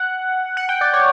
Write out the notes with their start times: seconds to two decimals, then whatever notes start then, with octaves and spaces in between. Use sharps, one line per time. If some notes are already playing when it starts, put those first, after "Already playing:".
Already playing: F#5
0.57 F#5
0.69 G5
0.81 D5
0.93 C#5